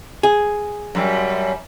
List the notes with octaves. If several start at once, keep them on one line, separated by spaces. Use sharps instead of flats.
G#4
F#2 G3